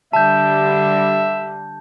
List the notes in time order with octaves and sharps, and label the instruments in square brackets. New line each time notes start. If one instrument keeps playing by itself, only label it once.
[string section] D3 G3 [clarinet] E5 [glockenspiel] A5 G6